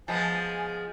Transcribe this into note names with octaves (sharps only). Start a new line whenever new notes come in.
F3 G#3 B3 G#5